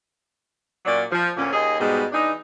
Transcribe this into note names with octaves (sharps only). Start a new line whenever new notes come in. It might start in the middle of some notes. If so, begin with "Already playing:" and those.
A#2 F#3 C#4 D5
F3
D2 A#2 C#4
D#2 G#4 D#5
G#2 B2 G3 G#3 B3
E3 D4 D#4